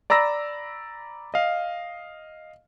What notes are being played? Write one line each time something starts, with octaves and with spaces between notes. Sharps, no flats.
D5 A#5 B5 E6 A#6
D#5 F5